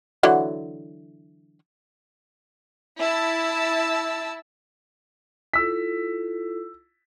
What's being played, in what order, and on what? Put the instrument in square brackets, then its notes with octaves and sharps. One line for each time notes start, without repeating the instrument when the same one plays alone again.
[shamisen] D3 E3 F#3
[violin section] E4 A5 E6
[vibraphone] E4 F4 A4 [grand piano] E6 B6